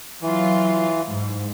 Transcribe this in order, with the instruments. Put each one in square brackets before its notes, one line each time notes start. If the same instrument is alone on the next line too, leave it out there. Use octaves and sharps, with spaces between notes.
[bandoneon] E3 [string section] F#3 F4
[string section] G#2